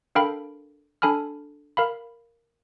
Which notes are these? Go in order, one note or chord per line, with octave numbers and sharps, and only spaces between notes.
D4 A4 A#4 F5 G5 B5
D4 A4 G#5 B5 F6
A#4 F5 B5